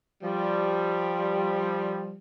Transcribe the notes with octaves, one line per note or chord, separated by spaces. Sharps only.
F3 G3